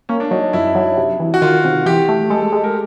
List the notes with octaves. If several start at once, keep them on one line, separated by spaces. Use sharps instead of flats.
A#3 C#4
D4
F#3 D#4
F#2 E4
F#3
C3
E3
F#4
D#3 F4
C3
E3 G4
A3
G#3 A4
A4
G#3
A#4